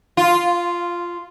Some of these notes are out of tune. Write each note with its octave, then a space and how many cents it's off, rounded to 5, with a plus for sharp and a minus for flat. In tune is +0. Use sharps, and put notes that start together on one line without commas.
F4 -5